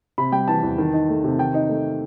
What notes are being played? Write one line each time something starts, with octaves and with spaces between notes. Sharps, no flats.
C3 B5
G3 G5
E3 A5
E2
D#3
D#4
A3
C3
D#3 G5
D#4
A3